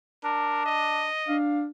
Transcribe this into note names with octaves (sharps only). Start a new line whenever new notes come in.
D4 A#4
D#5
D4 F5